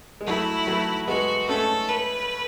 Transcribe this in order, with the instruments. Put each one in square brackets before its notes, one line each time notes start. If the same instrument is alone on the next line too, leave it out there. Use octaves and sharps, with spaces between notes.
[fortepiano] G#3
[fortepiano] F#3 A3 [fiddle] E4
[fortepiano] F#3 A3
[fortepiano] G#3 B3 [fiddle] F#4
[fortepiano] A3 C#4 [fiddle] A4
[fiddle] B4